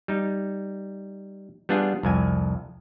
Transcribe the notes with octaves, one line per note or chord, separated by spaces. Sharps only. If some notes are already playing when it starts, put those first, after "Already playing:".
G3 D#4
G3 B3 D4 F4 G#4
C2 F2 G#5